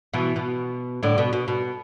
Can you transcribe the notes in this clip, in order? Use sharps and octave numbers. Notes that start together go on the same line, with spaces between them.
B2 E3
B2
A2 D3
B2
B2
B2